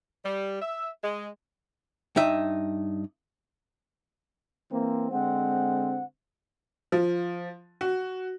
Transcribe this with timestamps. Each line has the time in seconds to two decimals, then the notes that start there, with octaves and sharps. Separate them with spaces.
0.24 G3
0.61 E5
1.02 G#3
2.16 G2 D#4 E5
4.72 E3 A#3 C4
5.12 D3 G#3 C4 F#5
6.92 F3
7.81 F#4